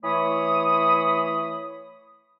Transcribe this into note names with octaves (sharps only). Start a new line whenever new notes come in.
E3 A3 C#5 B5 D#6